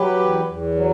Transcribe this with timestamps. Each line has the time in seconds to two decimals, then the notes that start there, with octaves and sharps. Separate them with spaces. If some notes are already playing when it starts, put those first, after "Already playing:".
Already playing: F#3 G4 B4
0.19 E2
0.46 E2
0.75 F#3